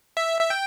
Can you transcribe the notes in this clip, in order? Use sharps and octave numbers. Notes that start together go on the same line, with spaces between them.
E5
E5
G5